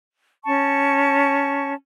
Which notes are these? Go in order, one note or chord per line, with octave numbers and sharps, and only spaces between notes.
C#4 A5 C#6